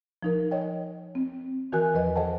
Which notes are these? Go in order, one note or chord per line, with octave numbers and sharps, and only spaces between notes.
F3 D#4 A#4
C#5 D#5 G5
C4
D#3 E3 F#4 A#4 G#5 F#6
E2 F3 B4 D#5
A4 C5 D#5 F#5 G5 A5